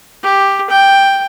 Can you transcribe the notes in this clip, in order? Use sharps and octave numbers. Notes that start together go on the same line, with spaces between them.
G4
G5